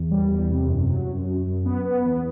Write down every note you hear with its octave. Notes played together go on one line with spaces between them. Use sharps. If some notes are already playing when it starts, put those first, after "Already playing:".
Already playing: E2
G3
E2
C3
F#2
F#3
F#2
F#2
F#2
B3
B3
E2